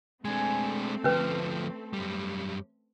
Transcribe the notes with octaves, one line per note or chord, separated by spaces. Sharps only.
G#3 A3 C4 D4 G#4 A4 G#5
D2 F3 C#4 B4
F#2 G3